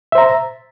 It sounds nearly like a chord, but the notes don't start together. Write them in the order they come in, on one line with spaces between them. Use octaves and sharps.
E5 C5 A#5